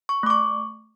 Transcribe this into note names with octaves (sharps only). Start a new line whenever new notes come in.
C#6
A3 D6
C#6